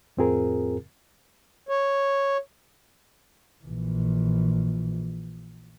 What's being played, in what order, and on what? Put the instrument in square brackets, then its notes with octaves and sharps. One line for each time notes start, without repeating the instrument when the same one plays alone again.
[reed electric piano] F2 A2 C4 F4 G#4 A#4
[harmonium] C#5
[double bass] A#1 E3